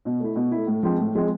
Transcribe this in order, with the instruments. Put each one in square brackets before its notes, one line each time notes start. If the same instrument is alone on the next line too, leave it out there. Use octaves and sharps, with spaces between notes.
[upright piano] B2
A3 E4
B2
A3 E4
A2
F3 G#3 C4
A2
F3 G#3 C4